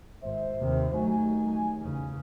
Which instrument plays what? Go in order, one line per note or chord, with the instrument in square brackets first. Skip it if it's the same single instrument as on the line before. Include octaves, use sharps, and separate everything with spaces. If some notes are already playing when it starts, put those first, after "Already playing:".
[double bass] G#1 [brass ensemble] C5 E5
[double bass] D#2 C3
[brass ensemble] D#2 D#4 G#5 [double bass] F#3 A3
[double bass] E2 C#3